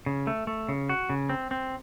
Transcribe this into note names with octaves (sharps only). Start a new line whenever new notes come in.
C#3
A3
A3
C#3
F#4
C#3
C4
C4